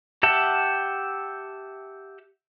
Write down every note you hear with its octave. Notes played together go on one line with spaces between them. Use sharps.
G4 E5 F#5 G5 A5